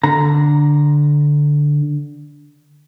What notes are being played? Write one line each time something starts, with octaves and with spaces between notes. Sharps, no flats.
D3 A#5